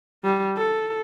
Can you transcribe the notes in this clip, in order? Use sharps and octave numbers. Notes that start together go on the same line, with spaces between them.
G3
A4